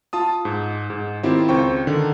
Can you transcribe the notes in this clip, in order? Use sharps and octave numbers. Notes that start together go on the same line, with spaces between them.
F4 A5 D#6
G#2
G#2
D#3 C4 E4 F4 G4 C5
C#2 C4 C5 G5 C#6
D3 D#3